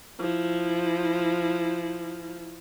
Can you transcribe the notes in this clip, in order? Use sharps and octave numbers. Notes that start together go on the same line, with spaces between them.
F3 E4